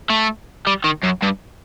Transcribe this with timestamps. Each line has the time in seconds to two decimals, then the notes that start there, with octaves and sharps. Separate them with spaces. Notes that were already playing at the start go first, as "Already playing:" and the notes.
0.10 A3
0.67 G3
0.84 D#3
1.03 F#2
1.22 G2